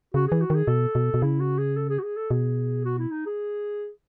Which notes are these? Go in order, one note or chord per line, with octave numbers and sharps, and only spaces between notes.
C#3 F#4
E3 G#4
F#4
D#3 G#4
B2 A4
B2
B2
C#3 E4
F#4
G#4
A4
G#4
F#4
G#4
A4
B2 G#4
F#4
E4
D#4
G#4